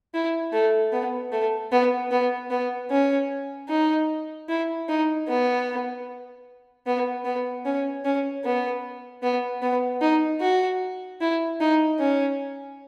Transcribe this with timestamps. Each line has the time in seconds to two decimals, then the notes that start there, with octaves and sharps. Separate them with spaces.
0.14 E4
0.53 A3
0.92 B3
1.32 A3
1.72 B3
2.11 B3
2.50 B3
2.91 C#4
3.69 D#4
4.49 E4
4.88 D#4
5.28 B3
6.86 B3
7.25 B3
7.65 C#4
8.05 C#4
8.44 B3
9.23 B3
9.62 B3
10.01 D#4
10.41 F#4
11.21 E4
11.60 D#4
12.00 C#4